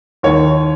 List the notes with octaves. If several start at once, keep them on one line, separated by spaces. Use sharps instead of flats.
D#2 D#3 C#5